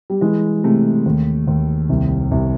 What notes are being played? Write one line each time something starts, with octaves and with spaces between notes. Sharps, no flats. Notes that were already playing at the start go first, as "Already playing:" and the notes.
G3
E3 G#3
C3 A3
D#2
D#2
C2
C2